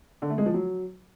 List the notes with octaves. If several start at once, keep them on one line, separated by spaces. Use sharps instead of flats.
D3
A3
G#3
F3
F#3